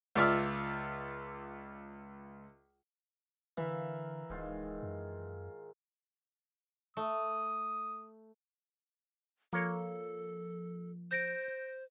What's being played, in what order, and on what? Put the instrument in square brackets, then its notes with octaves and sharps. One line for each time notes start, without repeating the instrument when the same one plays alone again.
[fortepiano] C#2 F4 D5 E5 F6
[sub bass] D3 [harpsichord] E3 [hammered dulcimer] A#4 E5 F5
[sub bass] D1 [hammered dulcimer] G#2 D#3 F4
[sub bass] F#2
[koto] A3 [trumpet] D#6
[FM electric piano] F3 [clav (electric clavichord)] A#3 C#5 [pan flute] A4
[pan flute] C5 [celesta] G6 A#6 D7